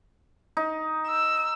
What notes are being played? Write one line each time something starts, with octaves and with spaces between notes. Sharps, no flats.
D#4
E6